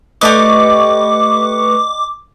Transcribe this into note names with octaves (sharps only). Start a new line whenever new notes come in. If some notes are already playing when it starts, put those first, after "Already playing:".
A3 G4 B4 D5 D#5 C#6 D6